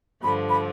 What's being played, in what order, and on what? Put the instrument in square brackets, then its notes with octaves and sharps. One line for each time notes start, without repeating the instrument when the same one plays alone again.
[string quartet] G2 D3 F3 [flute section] B5
[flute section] B5